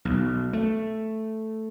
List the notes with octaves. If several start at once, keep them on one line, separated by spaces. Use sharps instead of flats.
B1
A3